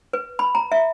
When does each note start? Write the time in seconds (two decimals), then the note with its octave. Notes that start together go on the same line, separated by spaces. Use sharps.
0.13 B4
0.39 B5
0.55 A#5
0.72 E5